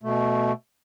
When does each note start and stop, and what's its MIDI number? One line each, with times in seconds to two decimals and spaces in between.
0.03 0.52 47
0.03 0.52 57